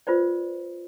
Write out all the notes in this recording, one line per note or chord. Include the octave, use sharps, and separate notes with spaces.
F4 B4 C5 D5